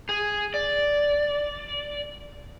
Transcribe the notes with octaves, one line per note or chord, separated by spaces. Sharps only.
G#4
D5